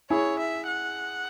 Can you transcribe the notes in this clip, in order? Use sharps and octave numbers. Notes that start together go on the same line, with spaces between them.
E4 G#4 C#5
E5
F#5